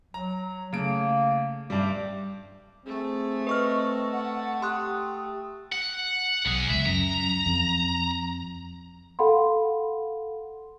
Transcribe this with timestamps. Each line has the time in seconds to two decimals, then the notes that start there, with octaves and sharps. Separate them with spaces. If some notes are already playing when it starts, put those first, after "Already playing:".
0.14 F#3 A#5
0.73 C#3 A3 A#3 D7
1.70 G2 G3 E5 G5 D6
2.86 A3 C4 G#4
3.47 B4 D#5 C#6 F6
4.12 F#5
4.62 G4 C6 D#6 F#6
5.72 F#5
6.46 B1 E2 G#4
6.70 C#2 E5
6.86 F#2 A#5
7.46 F2
9.19 A4 F5 F#5 B5 C6